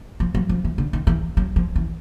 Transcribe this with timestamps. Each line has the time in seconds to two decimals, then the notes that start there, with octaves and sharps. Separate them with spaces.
0.20 F3
0.35 F#3
0.49 F3
0.65 E3
0.78 D3
0.93 D#3
1.07 E3
1.37 F#3
1.56 F3
1.76 E3